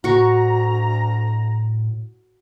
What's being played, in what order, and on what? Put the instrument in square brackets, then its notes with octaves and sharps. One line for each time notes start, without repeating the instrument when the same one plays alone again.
[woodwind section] D2 A#5 [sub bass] A2 [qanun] F#4 C#6